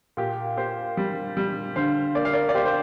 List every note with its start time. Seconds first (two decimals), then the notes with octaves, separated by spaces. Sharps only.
0.17 A#2 G4
0.57 A#3 G4 C5
0.97 G3
1.37 G3
1.76 D3 C5 F5
2.15 A#3 D5
2.25 F5
2.34 A#4 D5
2.49 D5
2.55 A#3 G4 C5
2.65 C5